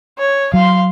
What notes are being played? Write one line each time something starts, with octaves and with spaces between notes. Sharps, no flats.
C#5
F#3 F5 C6